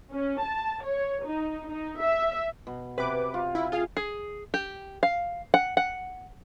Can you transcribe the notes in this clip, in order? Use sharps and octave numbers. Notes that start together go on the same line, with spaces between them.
C#4
A5
C#5
D#4
D#4
E5
B2
C3 B4 D6
F4
E4
F4 G#4 F5
G#4
G4
F5
F#5
F#5